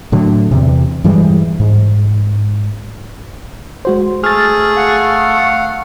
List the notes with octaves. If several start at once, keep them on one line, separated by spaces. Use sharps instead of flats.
A2 D3 F#3
E2 C3
G2 E3 G3 G#3
G#2
G#3 F#4 C5
A3 G#4 F6 A6
F5 F#5